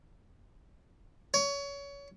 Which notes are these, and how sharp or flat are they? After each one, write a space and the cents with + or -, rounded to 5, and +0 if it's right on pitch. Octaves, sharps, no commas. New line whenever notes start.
C#5 +25